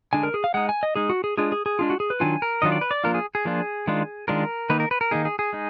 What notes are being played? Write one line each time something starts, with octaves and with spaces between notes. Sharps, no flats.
D3 G#3 D4 G#5
A#4
G#4
F5
G#3 D#4 F#5
G#5
D#5
G#3 D#4 G#4
F#4
G#4
G#3 D4 F4 G#4
G#4
G#4
G#3 D4 F4
F#4
G#4
B4
D#3 F#3 D4 F4 G#5
A#4
D#3 F#3 D4 F4 D#5
D5
B4
D5
F3 A#3 D4 F4 A#4
G#4
G#4
F3 A#3 D4 F4
D#3 G#3 D4 F4
D#3 G#3 D4 F4 A#4
D#3 A#3 D#4 B4
A#4
B4
A#4
D#3 A#3 D#4 G#4
G#4
G#4
G#3 D#4